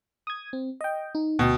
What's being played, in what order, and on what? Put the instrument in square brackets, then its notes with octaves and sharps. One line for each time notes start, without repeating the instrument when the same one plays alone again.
[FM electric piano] D#6 G#6
C4
D#5 G5
D#4
[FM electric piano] D2 G5 A6 [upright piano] B2